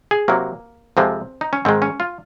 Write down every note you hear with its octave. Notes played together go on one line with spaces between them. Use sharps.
G#4
C3 F#3 A#3
F2 C3 F3 G#3 C4
D#4
C#4
G#2 D#3 G#3 C4
C#4
F4